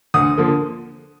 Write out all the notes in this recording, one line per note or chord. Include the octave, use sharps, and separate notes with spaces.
D2 D#6
D3 F3 A#3